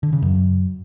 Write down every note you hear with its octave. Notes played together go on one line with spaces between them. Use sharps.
D3
C#3
F#2